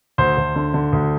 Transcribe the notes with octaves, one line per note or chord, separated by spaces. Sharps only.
D2 C5
D2
D3
D3
D2